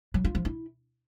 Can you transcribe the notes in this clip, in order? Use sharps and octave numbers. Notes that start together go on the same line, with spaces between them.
F#3
F4
F3
E4